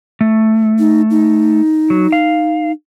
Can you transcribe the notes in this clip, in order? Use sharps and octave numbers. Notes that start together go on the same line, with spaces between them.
A3
D#4
D#4
F#3
F5